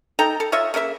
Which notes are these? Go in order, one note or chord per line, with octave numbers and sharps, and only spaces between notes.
D#4 A4 G5 A#5
A4
F4 C#5 D#5 E5
C#3 A#3 D#4 E5